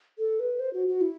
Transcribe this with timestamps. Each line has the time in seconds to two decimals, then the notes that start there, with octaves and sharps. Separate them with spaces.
0.19 A4
0.40 B4
0.60 C5
0.73 F#4
0.88 F#4
1.01 E4